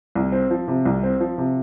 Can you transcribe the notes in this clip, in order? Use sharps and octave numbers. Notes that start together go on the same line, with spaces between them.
C2
C4
F3
C3
C2
C4
F3
C3